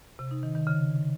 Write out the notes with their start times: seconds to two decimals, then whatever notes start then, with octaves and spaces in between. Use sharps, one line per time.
0.19 C3
0.31 D#4
0.43 D#3
0.55 D#3
0.67 C#3